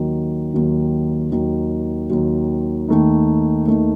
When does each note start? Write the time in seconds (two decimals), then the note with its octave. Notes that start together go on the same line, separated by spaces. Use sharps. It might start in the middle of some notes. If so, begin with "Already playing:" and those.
Already playing: D#2 D#3 F#3
0.54 D#2 D#3 F#3
1.31 D#2 D#3 F#3
2.10 D#2 D#3 F#3
2.88 D#2 D#3 A3 D#4
3.66 D#2 D#3 A3 D#4